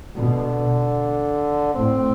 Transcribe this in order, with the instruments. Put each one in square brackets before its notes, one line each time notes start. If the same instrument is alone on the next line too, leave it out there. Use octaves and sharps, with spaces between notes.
[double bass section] B2 [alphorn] D3
[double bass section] A2 [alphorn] C4